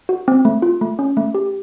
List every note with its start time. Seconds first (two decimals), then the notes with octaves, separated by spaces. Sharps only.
0.09 F#4
0.28 C4
0.45 A3
0.62 F4
0.81 A3
0.99 C#4
1.17 A3
1.34 G4